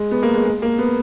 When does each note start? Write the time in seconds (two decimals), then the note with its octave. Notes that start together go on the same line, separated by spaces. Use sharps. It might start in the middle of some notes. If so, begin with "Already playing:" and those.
Already playing: G#3
0.11 B3
0.23 A#3
0.34 G#3
0.45 G#3
0.62 A#3
0.78 B3